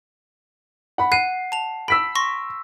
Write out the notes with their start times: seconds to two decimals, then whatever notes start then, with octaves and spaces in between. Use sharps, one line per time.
0.98 F#5 B5
1.12 F#5 F#6 C7 D#7
1.52 A5 F7
1.88 B5 E6 B6 D7
2.15 C6 C#6 A#6